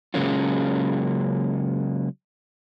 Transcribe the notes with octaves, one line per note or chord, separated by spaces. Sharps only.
C#3 F#3 G#3 A#3 C#4 F4